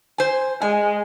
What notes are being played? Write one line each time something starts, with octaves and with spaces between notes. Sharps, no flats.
C5 G#5
G#3 G#5